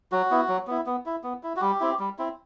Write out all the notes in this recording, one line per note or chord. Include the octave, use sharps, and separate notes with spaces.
F#3 F#4
B3 E4
F#3
B3 E4
B3
E4
B3
E4
F#4
G3 G4
C4 E4
G3
C4 E4